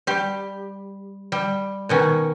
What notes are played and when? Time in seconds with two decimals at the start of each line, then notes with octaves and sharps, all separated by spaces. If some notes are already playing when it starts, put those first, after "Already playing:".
0.07 G3 G4
1.32 G3
1.89 B2 D#3 C#4